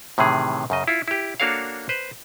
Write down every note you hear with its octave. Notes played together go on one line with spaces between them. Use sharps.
A2 C3 D#3 E3 G#4
F#2 C#3 D#5
E4 F4
E4 G4
A#3 D4 F#4 A4 C#5 F5
B4 C5